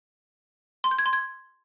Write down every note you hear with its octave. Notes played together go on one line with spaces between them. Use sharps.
C6
G6
G#6
C6
G#6